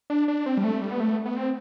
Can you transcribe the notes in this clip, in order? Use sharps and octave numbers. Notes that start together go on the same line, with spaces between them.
D4
D4
C4
G3
A3
G3
B3
A3
B3
C4